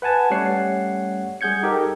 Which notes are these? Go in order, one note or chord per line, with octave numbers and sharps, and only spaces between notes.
B4 F#5 G#5 A5
G3 A3 C#4 C#5 F#5 C7
G3 G#4 F#5 G6 G#6 C#7
D#4 G4 A4 A#4